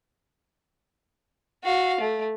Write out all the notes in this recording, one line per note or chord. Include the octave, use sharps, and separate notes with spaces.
F#4 F5
A3